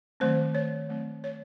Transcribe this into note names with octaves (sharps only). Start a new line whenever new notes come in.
D#3 F#3 A3 C4 C5
C#5
F#3 A3 C4
C#5